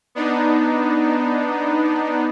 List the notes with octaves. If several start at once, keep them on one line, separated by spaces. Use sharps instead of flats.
B3 D4 D#4